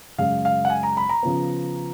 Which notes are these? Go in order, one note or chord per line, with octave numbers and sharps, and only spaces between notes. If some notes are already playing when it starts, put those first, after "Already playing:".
F#2 C#3 G#3 F5
F5
F#5
G#5
A#5
B5
A#5
C#3 F3 B3